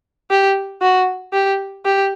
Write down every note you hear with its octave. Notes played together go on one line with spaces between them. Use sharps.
G4
F#4
G4
G4